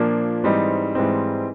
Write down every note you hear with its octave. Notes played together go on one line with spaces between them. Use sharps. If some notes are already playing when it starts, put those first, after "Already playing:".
Already playing: A#2 F3 A#3 D4
G#2 E3 G3 C4 D#4
G#2 E3 G3 C4 D#4